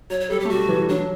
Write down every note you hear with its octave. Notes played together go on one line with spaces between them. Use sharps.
F#3 C#5
C#5
G3 A4
G4
A3
G3 F#4
E3
F#3 D4